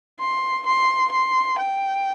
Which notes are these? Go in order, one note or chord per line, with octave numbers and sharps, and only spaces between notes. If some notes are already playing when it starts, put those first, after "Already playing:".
C6
C6
C6
G5